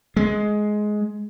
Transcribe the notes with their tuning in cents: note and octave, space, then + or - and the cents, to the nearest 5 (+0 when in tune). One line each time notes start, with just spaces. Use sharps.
G#3 +15